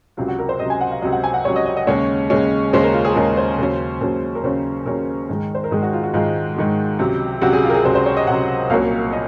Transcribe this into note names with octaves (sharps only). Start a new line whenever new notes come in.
C#2 C3 F#3 F4
F#4
A#4
C5
C#2 C3 F#3 D#5
G#5
F#5
F5
C#2 C3 F#3 D#5
F#5
G#5
F#5
C#2 C3 F#3 C#5
D#5
D#5
D#5
D#2 C#3 G#3 C#4 C#5
D#2 C#3 G#3 C#4
D#2 C#3 G#3 C#4 C5
A#4
F4
G#4
D#2 C#3 G#3 C#4 A#4
C5
D#2 C#3 F#3 C#4
D#2 C#3 F#3 C#4
A#4
D#2 C#3 F#3 C#4 C5
D#2 C#3 F#3 C#4 A#4
G#2 D#3 G#3
C5
A#4
G#2 D#3 G#3 G#4
F#4
F4
F#4
G#2 D#3 G#3 F4
G#2 D#3 G#3
C#2 C3 F#3
C#2 C3 F#3 F#4
G#4
F4
A#4
G#4
C#2 C3 F#3 C5
C5
C#5
D#5
C#2 C3 F#3 F#5
C2 A#2 F#3 A#3 C#4 F5
A#2 D#5